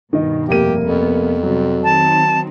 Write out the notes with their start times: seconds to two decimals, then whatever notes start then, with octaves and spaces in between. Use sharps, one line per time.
0.13 G2 B2 D#3 D#5
0.49 F1 A#3 G4 D#7
0.84 F2 B3
1.43 C3 F#3 G3
1.84 D#3 C4 D#4 A5